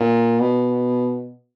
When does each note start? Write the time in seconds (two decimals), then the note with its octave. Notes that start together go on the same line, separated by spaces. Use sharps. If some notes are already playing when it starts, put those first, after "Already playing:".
Already playing: A#2
0.40 B2